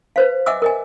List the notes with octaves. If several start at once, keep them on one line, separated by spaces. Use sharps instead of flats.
B4 C5 F5
D#5 E5 F#5 G#5 D6 E6
A#4 D#5 G#5